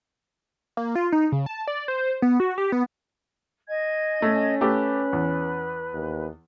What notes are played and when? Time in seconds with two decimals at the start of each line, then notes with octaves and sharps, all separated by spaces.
0.77 A#3
0.95 F4
1.12 D#4
1.32 C#3
1.46 A5
1.67 D5
1.88 C5
2.22 B3
2.40 F#4
2.58 G4
2.72 B3
3.68 D#5 G#5 G#6
4.22 A3 C#4
4.61 A3 G4 B4
5.13 E2
5.93 D#2